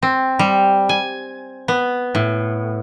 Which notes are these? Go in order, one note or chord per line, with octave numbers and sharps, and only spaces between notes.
C4
G3
G#5
B3
A2